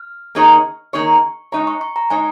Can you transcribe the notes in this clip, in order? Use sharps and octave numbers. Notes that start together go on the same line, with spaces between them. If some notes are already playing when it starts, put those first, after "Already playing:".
Already playing: F6
D#3 A#3 D#4 G#4 C#5
D#3 A#3 D#4 G#4 C#5 C#6
G#3 D#4 C#5 A#5
C#6
C#6
A#5
G#3 D#4 C#5 G#5